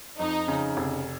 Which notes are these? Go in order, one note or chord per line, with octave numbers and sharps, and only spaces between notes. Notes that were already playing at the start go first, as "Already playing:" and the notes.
F2 D#4
C#3
F1